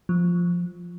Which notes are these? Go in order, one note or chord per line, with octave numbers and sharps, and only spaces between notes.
F3